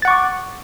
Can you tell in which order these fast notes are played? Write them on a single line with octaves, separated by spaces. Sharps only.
A6 F#5 C#6 D6